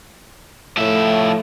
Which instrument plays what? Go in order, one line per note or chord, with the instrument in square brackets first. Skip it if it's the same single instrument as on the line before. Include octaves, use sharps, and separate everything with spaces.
[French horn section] A2 [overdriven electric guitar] F3 E5